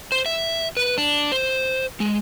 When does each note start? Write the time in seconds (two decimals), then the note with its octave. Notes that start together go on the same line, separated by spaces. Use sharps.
0.12 C5
0.26 E5
0.77 B4
0.98 D4
1.32 C5
2.00 G#3